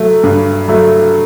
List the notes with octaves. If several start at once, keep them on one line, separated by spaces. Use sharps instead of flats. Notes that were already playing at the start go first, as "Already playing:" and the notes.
Already playing: F#3 A3
G2
F#3 A3